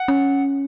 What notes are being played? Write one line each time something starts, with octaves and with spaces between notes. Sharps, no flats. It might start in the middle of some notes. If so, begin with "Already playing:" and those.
Already playing: F#5
C#4